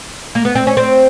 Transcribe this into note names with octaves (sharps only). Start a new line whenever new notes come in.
A#3
B3
C4
C#4
C4